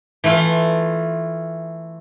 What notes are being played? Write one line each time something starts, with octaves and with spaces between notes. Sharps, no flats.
E3 A3 E4 F4